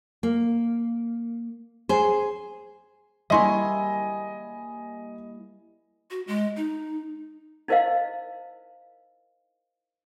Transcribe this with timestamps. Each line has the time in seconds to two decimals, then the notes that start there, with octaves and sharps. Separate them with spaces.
0.23 A#3
1.89 G#4 C5
3.30 G3 A#3 E4 D#5 E5 G#5 C6 C#6
6.11 F#4
6.27 G#3
6.57 D#4
7.68 D#4 E4 A#4 C5 D#5 F5